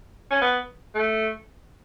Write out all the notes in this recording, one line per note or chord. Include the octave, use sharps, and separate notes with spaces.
C#4
B3
A3